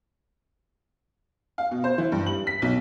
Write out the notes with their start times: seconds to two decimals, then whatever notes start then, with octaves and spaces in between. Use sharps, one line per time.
1.58 F5
1.71 B2
1.84 C5
1.98 E3
2.12 G2
2.26 F#7
2.47 B6
2.62 B1